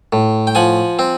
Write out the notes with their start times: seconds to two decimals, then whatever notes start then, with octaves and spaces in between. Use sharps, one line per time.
0.13 A2
0.47 G5
0.55 F3 F#5 G#5
0.99 C4